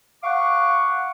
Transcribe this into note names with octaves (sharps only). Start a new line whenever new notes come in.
F5 F#5 C#6 D6